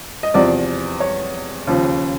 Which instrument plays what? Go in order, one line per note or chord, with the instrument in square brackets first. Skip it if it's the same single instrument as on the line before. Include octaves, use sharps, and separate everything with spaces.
[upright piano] D#5
E2 C3 F3 D5
C#5
D#2 C#3 F3